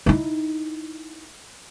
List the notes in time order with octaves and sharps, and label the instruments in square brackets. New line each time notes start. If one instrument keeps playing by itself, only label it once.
[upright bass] D#4 E4